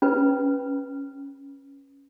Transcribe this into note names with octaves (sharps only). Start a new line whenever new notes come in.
C#4 B4